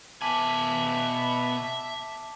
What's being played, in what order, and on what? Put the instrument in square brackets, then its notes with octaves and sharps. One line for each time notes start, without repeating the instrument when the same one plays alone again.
[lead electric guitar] B2 G#5 [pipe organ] E5 [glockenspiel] A5 D6 F#7